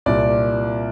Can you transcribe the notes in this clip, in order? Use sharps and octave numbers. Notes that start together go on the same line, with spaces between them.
C2 A#2 D5